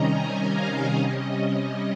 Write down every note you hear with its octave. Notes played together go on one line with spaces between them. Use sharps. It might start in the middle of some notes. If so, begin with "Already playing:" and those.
Already playing: C3 D#3 G3 C#4 D#5 A#5
G#5
F5
C3 G3 C#4 D#5
D#5